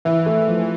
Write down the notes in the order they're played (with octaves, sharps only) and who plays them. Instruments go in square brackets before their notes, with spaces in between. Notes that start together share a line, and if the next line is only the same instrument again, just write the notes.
[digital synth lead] E3 [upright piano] E4
[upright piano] A3
F3